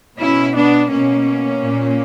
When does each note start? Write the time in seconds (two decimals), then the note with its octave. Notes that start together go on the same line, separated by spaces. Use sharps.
0.19 B2 C#4 E4
0.55 B3 D4
0.90 B2 A#3 C#4
1.62 A#2